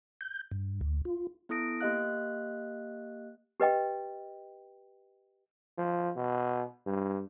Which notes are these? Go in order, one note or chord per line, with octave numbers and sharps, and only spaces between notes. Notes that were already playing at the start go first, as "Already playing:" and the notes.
G6
G2
D2
F4
B3 E4 A4 D#6 A#6 D7
A#3 G4 D#5 F5 F#6
G4 B4 D#5 G5
F3
B2
G2